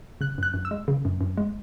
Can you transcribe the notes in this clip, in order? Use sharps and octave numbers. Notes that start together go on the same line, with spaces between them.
C#3 F#6
F#2 F#6
F#2
E6
G#3
C#3
F#2
F#2
G#3